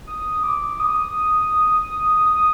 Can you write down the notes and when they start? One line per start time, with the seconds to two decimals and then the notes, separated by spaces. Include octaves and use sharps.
0.07 D#6
0.43 D6
0.80 D#6
2.26 D#6